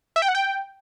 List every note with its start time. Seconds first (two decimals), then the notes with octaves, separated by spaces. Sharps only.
0.16 E5
0.22 G5
0.28 F#5
0.35 G5